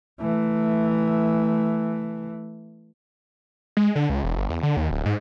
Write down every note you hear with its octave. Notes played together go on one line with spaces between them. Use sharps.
E3 A3
G#3
D3
C#2
E1
G1
E2
D3
D#2
D1
G#2